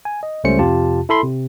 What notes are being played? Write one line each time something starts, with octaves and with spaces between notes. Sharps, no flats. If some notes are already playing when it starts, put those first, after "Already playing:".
G#5
D#5
C#2 G3 A3 C#4 C5 C#7
F2 C3 F4 G4 A5
E4 A4 B5 C6
C3